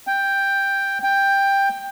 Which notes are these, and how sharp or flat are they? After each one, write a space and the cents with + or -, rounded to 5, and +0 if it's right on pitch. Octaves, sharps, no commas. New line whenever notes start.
G5 +5
G5 +10